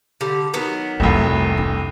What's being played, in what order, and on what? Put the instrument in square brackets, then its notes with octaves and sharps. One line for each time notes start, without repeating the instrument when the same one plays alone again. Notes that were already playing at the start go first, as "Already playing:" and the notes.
[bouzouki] D3 G3
D#3 F#3 B3
[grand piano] F1 C2 [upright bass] G3 A3
[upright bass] D4